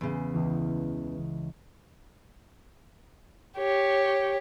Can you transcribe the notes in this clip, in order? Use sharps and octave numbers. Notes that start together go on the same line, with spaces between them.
E2 C#3
C#2 E3
G4 C#5